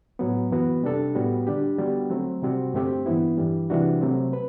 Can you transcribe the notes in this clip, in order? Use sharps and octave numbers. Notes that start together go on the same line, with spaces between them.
A2 F#3 B3
F#2 E3 B3 F#4
C3 G3 D4 A4
A2 G3 B3 F#4
D3 G3 D4 G4
D3 G3 B3 F#4
F#3 A3 C4
C3 G3 C4 F#4
G2 D3 A3 C4 G4
G2 E3 B3 E4
G2 E3 G3
C3 E3 G3 D4 F#4
C3 F#3 A3 C4
B4